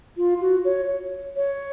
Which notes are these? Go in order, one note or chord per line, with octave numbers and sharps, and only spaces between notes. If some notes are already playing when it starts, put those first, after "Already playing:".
F4
F#4
C#5
C#5